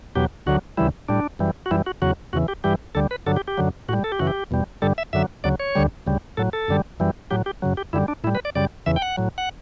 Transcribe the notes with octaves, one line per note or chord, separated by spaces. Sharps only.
E2 B2 F#3 G4
D2 D3 F#3 F#4
D2 C#3 E3 G3 E4
A2 G3 D4
F#2 E3 G3
F#4
F#2 E3 G3 E4
F#4
E2 C#3 F#3 F#4
E2 C#3 E3 F#4
G4
G2 E3 G3 G4
D2 D3 G3 A4
B4
G2 D3 F#3 A4
G4
G4
F#2 D3 F#3
A2 G3 F#4
A4
G4
F#2 C#3 E3 F#4
G4
E2 B2 G3
G2 D3 G3 A4
E5
F#2 D3 F#3 E5
D2 C#3 F#3 D5
C#5
D2 D3 G3
D2 C#3 G3
A2 F#3 A4
A4
F#2 D3 G3
F#2 E3 G3
A2 F#3 G4
G4
F#2 C#3 F#3
G4
F#2 D3 G3 E4
D4
A2 G3 E4
B4
D5
F#2 C#3 G3 D5
E2 C#3 E3 E5
G5
F#5
A2 F#3
F#5